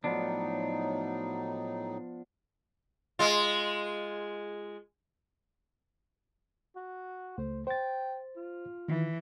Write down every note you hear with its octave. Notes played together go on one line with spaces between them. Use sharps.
A2 F3 F#3 B3 D4 D#4
G#3 F4
F#4
C#2 A3 C5
C5 G5 A6
F4
D#3 E3